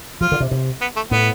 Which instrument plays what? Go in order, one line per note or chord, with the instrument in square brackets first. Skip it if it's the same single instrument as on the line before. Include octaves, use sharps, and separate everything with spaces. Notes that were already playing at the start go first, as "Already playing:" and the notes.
[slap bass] F3 [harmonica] F4
[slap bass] D3
C3
C3
[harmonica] B3
A3
[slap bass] A2 [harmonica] B3